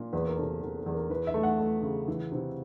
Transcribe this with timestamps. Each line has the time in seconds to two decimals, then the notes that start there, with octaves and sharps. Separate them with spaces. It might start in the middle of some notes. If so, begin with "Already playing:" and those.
Already playing: A#2
0.13 E2 B4
0.26 A#4
0.38 C3 A4
0.62 E2 A#4
0.78 A4
0.86 E2
0.95 A#4
1.10 E3 B4
1.27 E5
1.34 A3
1.43 F#5
1.60 A3
1.83 C#3
2.08 E3
2.32 C3